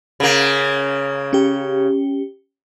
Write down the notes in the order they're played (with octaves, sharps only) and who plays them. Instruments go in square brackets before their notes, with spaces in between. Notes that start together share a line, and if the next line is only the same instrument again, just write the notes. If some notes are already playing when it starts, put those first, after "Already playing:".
[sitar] C#3 A#3
[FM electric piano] C#4 G4